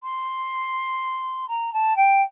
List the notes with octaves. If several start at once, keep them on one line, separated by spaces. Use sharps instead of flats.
C6
A#5
A5
G5